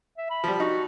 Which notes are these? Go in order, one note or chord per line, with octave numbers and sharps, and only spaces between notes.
E5
B5
F3 G3
D#4 F#4